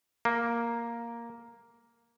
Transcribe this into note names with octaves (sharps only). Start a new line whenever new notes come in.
A#3